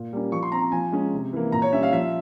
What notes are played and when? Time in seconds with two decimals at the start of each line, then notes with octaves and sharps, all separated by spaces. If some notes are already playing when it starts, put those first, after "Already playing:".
Already playing: A#2
0.13 G3 A#3 C#4
0.32 F3 C#6
0.43 C6
0.52 C4 A#5
0.72 F3 G#5
0.92 G#3 C#4
1.13 C3
1.33 E3 A#3
1.52 A#2 A#5
1.62 C#5
1.73 G3 C#4 E5
1.83 F5
1.92 F3 E5